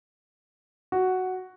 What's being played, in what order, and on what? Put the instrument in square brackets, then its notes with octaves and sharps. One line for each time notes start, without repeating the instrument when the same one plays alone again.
[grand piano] F#4